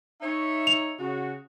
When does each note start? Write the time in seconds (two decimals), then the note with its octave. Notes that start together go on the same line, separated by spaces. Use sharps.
0.22 D#4 C#5 E5
0.67 F7
0.99 C#3 F#4